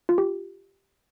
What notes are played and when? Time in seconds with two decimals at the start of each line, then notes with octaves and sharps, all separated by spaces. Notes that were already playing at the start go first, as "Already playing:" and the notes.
0.09 F4
0.18 G4